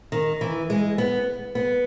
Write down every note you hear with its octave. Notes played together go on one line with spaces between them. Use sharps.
D#3
E3
G#3
B3
B3